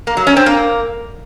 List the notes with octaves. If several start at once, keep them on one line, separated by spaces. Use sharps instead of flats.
A#3
F#3
C#4
C4
A#3